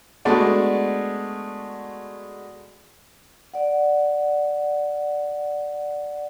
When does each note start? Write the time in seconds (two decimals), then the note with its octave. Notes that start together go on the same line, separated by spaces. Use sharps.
0.25 G#3 A3 B3 D4 F#4 D5
3.54 D5 F#5